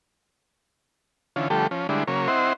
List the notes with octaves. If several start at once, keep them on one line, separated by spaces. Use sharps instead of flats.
D3 E3 C#4 F4
D3 F3 G3 A3 G4 A4
F3 C#4
D3 G3 G#3 D4 E4
C#3 F#3 A#3 C#5
C4 E4 C5 D#5 F#5 C6